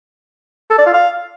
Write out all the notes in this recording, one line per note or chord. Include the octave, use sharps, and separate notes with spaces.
A4
D5
F4
F5